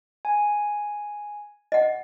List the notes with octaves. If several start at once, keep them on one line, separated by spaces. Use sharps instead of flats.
G#5
D#5 F#5